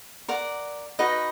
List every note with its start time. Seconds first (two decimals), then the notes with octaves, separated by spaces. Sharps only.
0.29 A#4 D5 F#5
0.99 D#4 F#4 B4 D#5